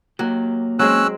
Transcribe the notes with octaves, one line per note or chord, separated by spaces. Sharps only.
F#3 A#3 G4
F#3 G#3 C4 C#4 E6 F#6